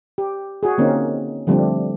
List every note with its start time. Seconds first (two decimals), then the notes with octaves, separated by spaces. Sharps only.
0.18 G4
0.63 F#4 G#4
0.78 D3 A#3 C4 C#4 D#4
1.47 D3 F3 G3 A3 C4 D4